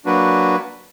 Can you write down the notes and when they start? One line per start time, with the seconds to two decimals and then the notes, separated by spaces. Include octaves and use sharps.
0.05 F#3 A#3 D4 F#4 B4